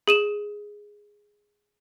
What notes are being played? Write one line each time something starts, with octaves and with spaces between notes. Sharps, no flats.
G#4 D#7 E7